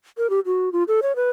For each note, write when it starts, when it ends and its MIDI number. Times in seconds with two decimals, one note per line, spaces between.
0.18 0.30 70
0.30 0.40 67
0.46 0.72 66
0.72 0.83 65
0.88 1.00 69
1.02 1.15 73
1.16 1.31 71